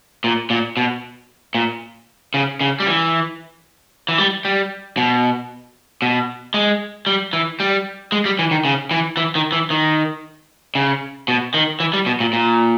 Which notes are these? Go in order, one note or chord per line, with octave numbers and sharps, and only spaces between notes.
A#2
A#2
B2
A#2
C#3
C#3
G3
E3
E3
G3
G3
B2
B2
G#3
G3
E3
G3
G#3
G3
E3
D#3
C#3
E3
E3
D#3
E3
D#3
C#3
B2
D#3
E3
G3
B2
A#2
A#2